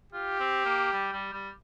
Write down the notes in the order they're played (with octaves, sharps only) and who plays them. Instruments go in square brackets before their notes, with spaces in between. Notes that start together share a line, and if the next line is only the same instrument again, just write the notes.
[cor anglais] F4 [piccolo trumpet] G4
[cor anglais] C4
A#3
G3
G3
G3